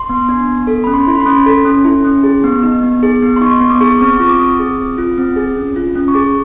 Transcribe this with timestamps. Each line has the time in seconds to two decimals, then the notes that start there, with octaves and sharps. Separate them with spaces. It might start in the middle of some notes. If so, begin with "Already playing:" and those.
Already playing: C6
0.09 B3
0.29 D4
0.48 B3
0.67 A4
0.84 C#4 B5
0.94 C6
1.07 E4
1.15 B5
1.20 C6
1.26 C#4
1.46 A4
1.65 C#4
1.84 E4
2.05 C#4
2.24 G#4
2.44 B3
2.63 D#4
2.83 B3
3.03 G#4
3.22 B3
3.36 C6
3.41 D#4 C#6
3.60 B3
3.70 D6
3.81 G#4 C#6
3.99 C4 C#6
4.18 F4 C#6
4.29 D6
4.39 C4 D#6
4.59 G#4
4.79 C4
4.98 F4
5.18 C4
5.36 G#4
5.56 C#4
5.76 F4
5.95 C#4
6.08 C#6
6.14 G#4 D6